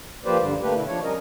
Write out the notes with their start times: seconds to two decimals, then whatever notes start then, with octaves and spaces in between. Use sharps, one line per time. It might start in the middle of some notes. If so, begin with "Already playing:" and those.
0.25 F3 A#3 G4 B4 C5 D5
0.39 G2 D3 G3
0.62 A3 A#3 D4 G4 B4
0.75 B2 D3 E4
0.87 F3 D4 C#5
1.03 G3 C#4 A#4 D#5